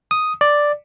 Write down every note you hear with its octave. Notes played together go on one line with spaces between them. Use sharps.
D#6
D5